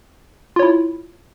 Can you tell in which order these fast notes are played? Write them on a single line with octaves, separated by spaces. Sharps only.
F4 C#5 E4